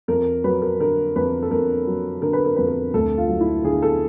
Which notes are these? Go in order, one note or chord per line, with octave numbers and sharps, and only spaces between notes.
F2 A#4
F#3 B4
A#4
D3 A#4
F2 B4
A4
F2 A#4
F#3
D3 A#4
B4
A#4
F2 B4
A#4
D2 A4
F4
F#3
E4
D3 G#4
A4